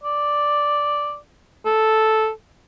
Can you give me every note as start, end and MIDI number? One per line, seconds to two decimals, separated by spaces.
0.03 1.17 74
1.65 2.30 69